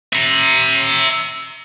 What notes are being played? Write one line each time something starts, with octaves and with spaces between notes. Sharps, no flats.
E5 A#5